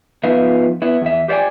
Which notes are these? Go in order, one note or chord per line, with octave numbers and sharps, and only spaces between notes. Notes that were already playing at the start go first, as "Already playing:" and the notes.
F3 B3 D#4 F4 B4 E5
B3 E4
E2 E5
G4 C5 D5 F5 G5 G#5